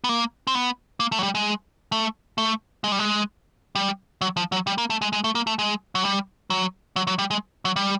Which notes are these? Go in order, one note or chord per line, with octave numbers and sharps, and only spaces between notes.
B3
A#3
C4
B3
A#3
A3
F#3
G3
G#3
A3
A3
G#3
G3
G#3
G3
F#3
F3
F#3
G3
A#3
A3
G#3
G#3
A3
A#3
A3
G#3
F#3
G3
F#3
F#3
F#3
G3
G#3
F#3
G3